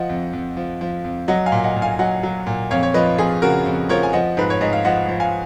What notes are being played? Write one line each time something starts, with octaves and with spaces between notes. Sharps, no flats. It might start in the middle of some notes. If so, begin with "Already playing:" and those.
Already playing: F3 D#5 F#5
F2
F2
F3
F3
F2
F#3 D#5 F#5
F5 G#5
A#2
D#5 F#5
A#2
F5 G#5
F#3 D#5 F#5
F#3
A#2
F2 C#5 F5
C#5
F3 B4 D#5
F2 F4 G#4
C#3 F#4 A#4
F2
F3 A#4 C#5
G#5
F3 D#5 F#5
G#2 B4
C#5
G#2 D#5
F5
F3 D#5 F#5
F3
F5 G#5